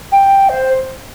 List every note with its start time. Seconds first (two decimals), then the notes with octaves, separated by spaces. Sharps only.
0.12 G5
0.49 C5